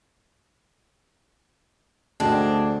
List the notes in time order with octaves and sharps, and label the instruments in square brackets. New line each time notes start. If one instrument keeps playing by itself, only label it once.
[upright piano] D2 [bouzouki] G#3 C4 D4